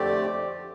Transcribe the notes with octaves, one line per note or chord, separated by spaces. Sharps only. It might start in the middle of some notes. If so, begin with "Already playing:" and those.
Already playing: F2 D3 A3 C4 G4 D5